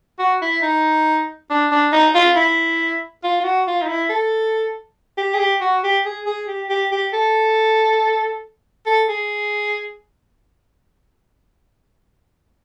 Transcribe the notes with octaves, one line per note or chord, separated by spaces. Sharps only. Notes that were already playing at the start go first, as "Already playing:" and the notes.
F#4
E4
D#4
D4
D4
D#4
F4
E4
F4
F4
F#4
F4
D#4
E4
A4
G4
G#4
G4
F#4
G4
G#4
G#4
G4
G4
G4
A4
A4
G#4